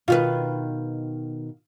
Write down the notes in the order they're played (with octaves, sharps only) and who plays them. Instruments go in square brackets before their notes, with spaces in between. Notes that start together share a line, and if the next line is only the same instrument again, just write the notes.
[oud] B2 D#3 B4 [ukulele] F4